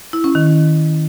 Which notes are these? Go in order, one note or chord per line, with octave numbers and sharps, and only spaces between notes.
E4
C#4
D#3